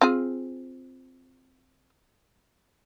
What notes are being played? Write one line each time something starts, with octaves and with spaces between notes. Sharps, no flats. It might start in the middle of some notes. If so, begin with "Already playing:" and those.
C4 F4 G#4